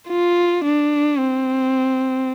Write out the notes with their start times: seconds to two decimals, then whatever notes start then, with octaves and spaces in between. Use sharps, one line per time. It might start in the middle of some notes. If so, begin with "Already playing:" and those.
0.09 F4
0.64 D4
1.18 C4